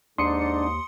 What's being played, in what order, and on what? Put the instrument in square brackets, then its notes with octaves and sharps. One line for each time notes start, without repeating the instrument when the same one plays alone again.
[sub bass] D#2 [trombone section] G#2 [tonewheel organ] D4 [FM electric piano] C6 D#6 C#7